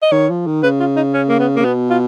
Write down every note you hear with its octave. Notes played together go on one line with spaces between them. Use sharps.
D#5
D#3 C#5
F3
D#3
C#3 B4
F4
D#4
C#4
A#3
B3
C#3 A#3
B2 B3
F4